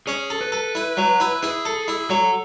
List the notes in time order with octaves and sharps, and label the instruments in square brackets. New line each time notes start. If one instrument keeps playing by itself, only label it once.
[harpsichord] C#4 [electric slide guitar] G#4
[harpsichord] A4
[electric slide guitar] B4
[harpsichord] A4
E4
F#3
E4
[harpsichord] E4 [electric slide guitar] G#4
[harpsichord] A4
E4
[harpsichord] F#3 [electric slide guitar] A4